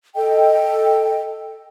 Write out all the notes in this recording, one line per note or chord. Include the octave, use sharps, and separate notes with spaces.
A4 D#5 G5